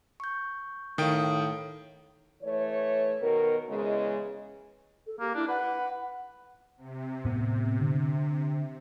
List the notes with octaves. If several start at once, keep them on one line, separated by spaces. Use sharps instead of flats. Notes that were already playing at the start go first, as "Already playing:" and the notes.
C#6 G6
A2 D#3 F5 G5 D#6
E3 A3 C#5
B2 D#3 A#4
E2 C#3 E3 G#3
A4
A#3 G4
D4 E4
B4 F#5
C3
A2 B3
D3